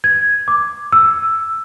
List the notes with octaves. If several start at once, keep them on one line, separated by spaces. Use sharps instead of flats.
G#6
D6
E6